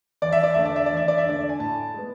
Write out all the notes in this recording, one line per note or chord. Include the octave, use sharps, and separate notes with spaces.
E2 D5
E5
D5
D3 A3 E5
D5
E5
E2 D5
E5
D5
E5
D3 A3 D5
G#5
A2 A5
G#3 B3